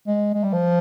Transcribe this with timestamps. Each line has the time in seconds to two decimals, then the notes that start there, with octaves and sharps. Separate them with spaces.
0.07 G#3
0.34 G#3
0.44 G3
0.53 F3